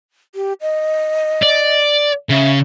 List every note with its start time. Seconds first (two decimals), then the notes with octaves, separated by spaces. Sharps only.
0.35 G4
0.61 D#5
1.43 D5
2.30 C#3 E5